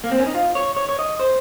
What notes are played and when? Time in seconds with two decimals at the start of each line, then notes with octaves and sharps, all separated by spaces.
0.04 A#3
0.12 C4
0.19 C#4
0.27 D#4
0.35 F4
0.55 C#5
0.77 C#5
0.89 C#5
0.99 D#5
1.20 C5